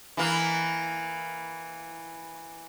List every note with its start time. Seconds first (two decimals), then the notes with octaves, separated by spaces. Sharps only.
0.17 E3 A#3